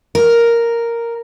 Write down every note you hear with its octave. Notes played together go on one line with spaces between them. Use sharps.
A#4